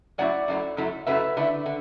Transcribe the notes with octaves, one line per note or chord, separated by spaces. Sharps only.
F#2 F#3 A3 E4 D5 F#5
F#2 F#3 A3 E4
F#2 F#3 A3 E4
F#2 F#3 A3 E4 B4 E5
D3 A3 E4
D3